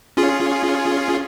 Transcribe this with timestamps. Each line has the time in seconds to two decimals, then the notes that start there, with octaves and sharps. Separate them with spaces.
0.17 C#4 F4 G#4